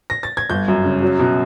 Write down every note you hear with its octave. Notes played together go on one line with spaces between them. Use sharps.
A#6
A6
G#6
G1 G6
F#2
C#3
F#3
B2